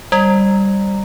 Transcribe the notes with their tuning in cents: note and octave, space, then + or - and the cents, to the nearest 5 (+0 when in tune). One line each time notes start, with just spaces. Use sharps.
G3 +0 D5 +45